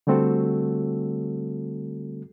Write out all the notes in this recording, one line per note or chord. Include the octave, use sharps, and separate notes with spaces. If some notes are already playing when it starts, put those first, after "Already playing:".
D3 G3 A3 C4 F#4 A4